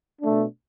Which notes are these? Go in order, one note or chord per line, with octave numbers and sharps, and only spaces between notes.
B2 A3 D4